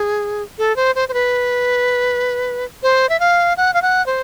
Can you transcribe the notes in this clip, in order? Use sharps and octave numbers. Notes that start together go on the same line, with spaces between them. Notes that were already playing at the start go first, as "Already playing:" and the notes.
Already playing: G#4
A4
C5
C5
C5
B4
C5
E5
F5
F#5
F5
F#5
C5